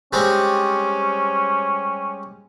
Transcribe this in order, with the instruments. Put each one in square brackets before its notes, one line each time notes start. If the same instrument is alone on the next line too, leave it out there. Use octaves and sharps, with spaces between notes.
[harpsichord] G3 G#3 C4 [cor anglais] C#4